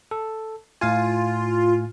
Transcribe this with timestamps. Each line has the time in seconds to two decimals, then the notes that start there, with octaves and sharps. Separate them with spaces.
0.11 A4
0.81 A2 F4 F5 G#5